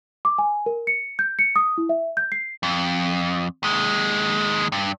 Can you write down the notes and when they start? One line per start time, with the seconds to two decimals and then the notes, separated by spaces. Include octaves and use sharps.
0.25 D6
0.38 G#5
0.66 A#4
0.87 C#7
1.19 G6
1.39 C#7
1.56 D#6
1.78 E4
1.89 E5
2.17 G6
2.32 C7
2.63 F2
3.63 D#2 G#3
4.72 G2